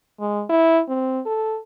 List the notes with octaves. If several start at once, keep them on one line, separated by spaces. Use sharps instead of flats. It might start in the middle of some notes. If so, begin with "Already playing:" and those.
G#3
E4
C4
A4